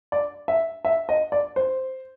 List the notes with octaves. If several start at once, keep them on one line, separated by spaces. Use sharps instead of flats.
D5
E5
E5
D#5
D5
C5